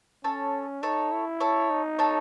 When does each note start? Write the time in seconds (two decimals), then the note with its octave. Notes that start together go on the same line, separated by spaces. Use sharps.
0.24 C#4 A4 C#5
0.83 D#4 A4 C#5
1.12 E4
1.40 A4 C#5
1.70 D#4
1.99 A4 C#5